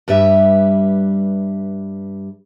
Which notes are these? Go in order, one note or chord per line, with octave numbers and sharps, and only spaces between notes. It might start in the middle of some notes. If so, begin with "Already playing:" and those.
G2 G3 B4 E5